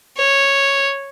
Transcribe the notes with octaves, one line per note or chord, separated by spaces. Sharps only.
C#5